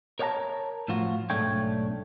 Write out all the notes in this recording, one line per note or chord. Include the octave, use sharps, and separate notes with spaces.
A#4 C#5 D5 F#5 A5 A#5
A2 F3 F4 F#4
B1 G#2 A3 D4 C#5 G5